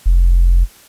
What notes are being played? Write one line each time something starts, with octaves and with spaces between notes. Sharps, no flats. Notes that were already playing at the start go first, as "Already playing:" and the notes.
F1